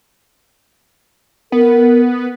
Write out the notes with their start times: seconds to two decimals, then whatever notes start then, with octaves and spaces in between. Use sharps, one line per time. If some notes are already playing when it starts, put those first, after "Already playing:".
1.52 B3 A#4